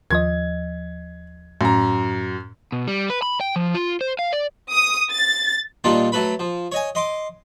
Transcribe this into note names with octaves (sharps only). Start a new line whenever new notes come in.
D#2 F3 D#5 G#6
F#2 A2 A#5
B2
G3
B4
B5
G5
F3
F4
C5
F5
D5
D#6
A6
A#2 G3 D4 D#4 F4
F#3 A3 A4 B4 B5
F3
C#5 D#5 G#5
D#5 C6 D6